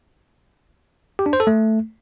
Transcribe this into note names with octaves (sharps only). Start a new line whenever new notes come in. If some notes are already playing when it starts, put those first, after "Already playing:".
G4
D4
C5
A4
A3